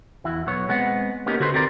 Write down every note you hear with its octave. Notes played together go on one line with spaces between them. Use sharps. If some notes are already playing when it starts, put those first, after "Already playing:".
E2 E4 F#4
B1 B3 C#5
G#3 B3 C4 F#5
A#3 B3 C#4 D#4 G4 A#4
D3 F#4 A4 B4 C5 C6
D#2 C4 G4 A#4 D5 C6